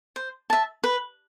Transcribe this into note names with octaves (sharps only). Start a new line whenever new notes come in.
C5
E5 A5
B4